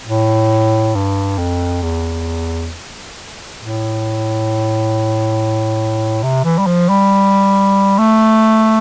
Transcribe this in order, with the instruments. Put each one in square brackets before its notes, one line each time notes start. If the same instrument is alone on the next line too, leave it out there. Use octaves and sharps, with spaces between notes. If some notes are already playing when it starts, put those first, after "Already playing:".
[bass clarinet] A2
G2
F2
E2
A2
C3
E3
G3
F3
G3
A3